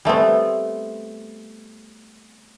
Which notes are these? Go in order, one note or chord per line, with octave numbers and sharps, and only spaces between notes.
G3 A3 B3 C4